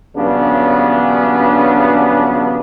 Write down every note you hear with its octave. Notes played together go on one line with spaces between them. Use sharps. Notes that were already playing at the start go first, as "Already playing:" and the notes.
A#1 G2 C#3 F#3 B3 D4